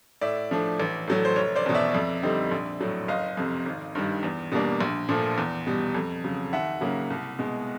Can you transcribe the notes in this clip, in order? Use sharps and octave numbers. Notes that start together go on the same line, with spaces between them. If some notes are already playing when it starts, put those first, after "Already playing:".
A2 D5 E5
F3 A3 D4
A1
A2 F#3 A3
C5
F1 C#5
C5 D5
E2 B2
D5 E5
F2
D3 G3 C4 D#4
A#1
A2 F#3
F#1 D#5 F5
F2 C3
G#1
G2 D#3 G3
E2
B2 G3 A#3 D4
A#1
A#2 F3 A3
E2
B2 G3
F2
C#3 F#3
D#2 E5 F#5
C#3 F#3 A#3
C2
B2 G#3